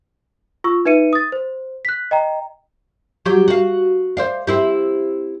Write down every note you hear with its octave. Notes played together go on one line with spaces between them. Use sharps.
F4 C#6 E6
D#4 B4 E5 C#7 D#7
D#6 A6
C5
F#6 B6
D#5 G5 A#5
F#3 G4
F#4 F5
C5 D5 F5
C4 E4 G4